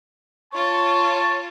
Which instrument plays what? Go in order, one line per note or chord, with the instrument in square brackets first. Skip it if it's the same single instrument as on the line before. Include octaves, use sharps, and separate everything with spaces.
[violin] F4 C#5 [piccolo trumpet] A5 [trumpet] C#6